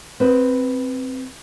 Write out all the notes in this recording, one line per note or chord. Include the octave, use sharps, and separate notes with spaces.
C4 B4